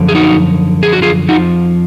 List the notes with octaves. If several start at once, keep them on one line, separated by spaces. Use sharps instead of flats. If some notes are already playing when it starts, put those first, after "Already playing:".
Already playing: F#2 D3 F3
G#4
D#4 F#4
G#4
F#4
F4 G#4
F2 F3 D#4 F#4